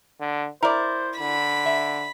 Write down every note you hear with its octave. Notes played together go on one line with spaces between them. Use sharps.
D3
E4 A#4 C5 D5
D3 B5
E5